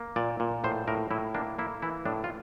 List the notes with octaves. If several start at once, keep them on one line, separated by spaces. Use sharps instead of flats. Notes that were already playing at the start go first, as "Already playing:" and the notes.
Already playing: A#3
A#2 D5
A#2
A2 C5
A2 A#4
A2 E4
A#3 D4
A#3 E4
E3 E4
A2 D4
F4